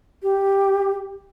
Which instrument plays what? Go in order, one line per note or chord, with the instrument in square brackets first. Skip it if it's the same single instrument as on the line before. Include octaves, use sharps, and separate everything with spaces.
[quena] G4